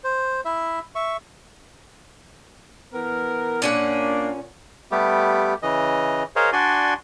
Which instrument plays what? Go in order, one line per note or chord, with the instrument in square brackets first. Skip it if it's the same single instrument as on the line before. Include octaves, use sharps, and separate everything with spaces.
[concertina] C5
E4 E5
E5 C#6
[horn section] E3 B3 A#4
[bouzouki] A#2 C#4 F#5 [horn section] A#3 D4
[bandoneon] G3 A3 B3 G4
C#3 E3 D#5
G#4 A#4 C5 C#5 D#5 F5
D4 F#4 D5 G#5 C6